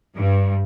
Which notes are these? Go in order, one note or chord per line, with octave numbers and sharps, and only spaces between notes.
G2